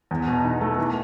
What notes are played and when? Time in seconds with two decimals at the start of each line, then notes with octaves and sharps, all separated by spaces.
0.11 E2
0.28 B2
0.44 D#4
0.61 A3
0.78 E3